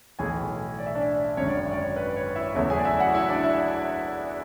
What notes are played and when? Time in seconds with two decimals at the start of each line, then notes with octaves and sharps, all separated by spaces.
0.19 B1 A2 E3 A3 G#4 G#5
0.78 D5
0.86 E5
0.95 D4 D5
1.37 G#1 F#2 D3 C#5
1.48 D5
1.59 C#5
1.71 D5
1.81 C#5
1.96 B4
2.16 C#5
2.35 E4 E5
2.55 E2 C#3 F#3 A3 E4 E5
2.70 G#4 G#5
2.78 D5
2.85 E4 E5
2.99 F#4 F#5
3.14 E4 E5
3.29 D4 D5
3.43 E4 E5